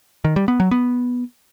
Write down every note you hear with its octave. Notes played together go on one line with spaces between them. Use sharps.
D#3
G3
B3
F#3
B3